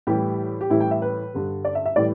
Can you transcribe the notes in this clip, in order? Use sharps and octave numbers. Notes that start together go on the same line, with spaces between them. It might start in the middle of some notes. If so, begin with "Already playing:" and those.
A2 E3 G3 G4
G4
A2 E3 G3 E4
G5
E5
B4
G2 D3 G3
D5
E5
E5
A2 E3 G3 D5